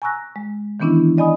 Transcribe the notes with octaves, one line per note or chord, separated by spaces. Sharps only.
G#5 A#5 C#6 E6 F#6 A#6
G#3
D#3 E3 B3 C#4 D4 E4
D5 D#5 G#5 B5 D#6